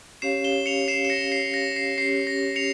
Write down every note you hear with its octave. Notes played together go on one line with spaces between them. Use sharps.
C#4 G4 C#5 F5 C7 E7
E7 G7
C#7 F7
C7 E7
E7
A#6 C#7
C7
A#6
C7
C#4 G4 C#5 C7
A#6
C#7 F7